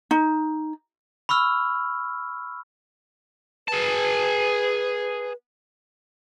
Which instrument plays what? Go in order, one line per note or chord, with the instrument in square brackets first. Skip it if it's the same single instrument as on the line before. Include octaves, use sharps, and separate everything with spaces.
[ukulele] D#4
[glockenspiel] B5 C#6 E6 F6
[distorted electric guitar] G#4 A5 [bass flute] B4